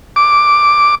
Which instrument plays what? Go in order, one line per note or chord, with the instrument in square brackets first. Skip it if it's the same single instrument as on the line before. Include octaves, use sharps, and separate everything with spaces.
[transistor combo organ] D6